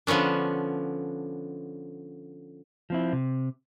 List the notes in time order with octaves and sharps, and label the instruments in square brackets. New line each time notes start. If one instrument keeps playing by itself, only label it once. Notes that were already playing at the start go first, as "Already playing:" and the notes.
[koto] D3 F3 B3 C#4 D4
[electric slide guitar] F3 C4 E4
C3